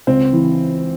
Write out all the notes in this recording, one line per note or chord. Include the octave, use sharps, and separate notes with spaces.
C#2 C4
E3